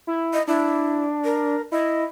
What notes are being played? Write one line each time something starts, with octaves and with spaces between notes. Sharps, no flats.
E4
D#5
D4 E4
A#4
E4 D#5